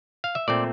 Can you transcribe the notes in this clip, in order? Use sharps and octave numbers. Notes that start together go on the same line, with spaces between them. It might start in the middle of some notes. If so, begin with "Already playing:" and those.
F5
E5
A#2 A3 C4 D5